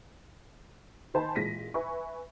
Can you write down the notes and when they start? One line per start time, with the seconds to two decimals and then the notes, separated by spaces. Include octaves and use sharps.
1.14 D#3 D#4 C5 G#5 A5 B5
1.35 A1 A#2 G#3 A#6 B6 D#7
1.74 B4 E5 G#5 C#6